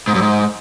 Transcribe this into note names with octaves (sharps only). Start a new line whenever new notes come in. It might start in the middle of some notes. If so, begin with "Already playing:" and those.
G#2
F#2
G#2